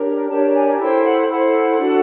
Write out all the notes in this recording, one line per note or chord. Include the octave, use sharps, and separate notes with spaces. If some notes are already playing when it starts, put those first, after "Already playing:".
Already playing: D4 G4 A#4 C#5
D4 G4 A#4 C#5 A5
G#5
E4 A4 C5 G5
F#5
E4 A4 C5 F#5
D4 F#4 A4